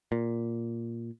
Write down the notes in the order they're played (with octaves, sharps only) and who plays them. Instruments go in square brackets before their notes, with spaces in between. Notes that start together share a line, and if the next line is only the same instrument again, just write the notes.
[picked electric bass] A#2